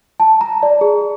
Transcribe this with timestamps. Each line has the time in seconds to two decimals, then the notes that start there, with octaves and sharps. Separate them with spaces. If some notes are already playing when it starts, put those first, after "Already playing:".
0.20 A5
0.41 A#5
0.63 D5
0.81 G#4